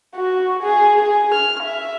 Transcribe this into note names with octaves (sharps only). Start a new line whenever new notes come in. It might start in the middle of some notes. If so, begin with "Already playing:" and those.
F#4
G#4
G#4
F6
E5